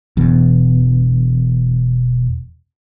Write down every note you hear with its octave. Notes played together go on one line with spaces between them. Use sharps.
E1 E2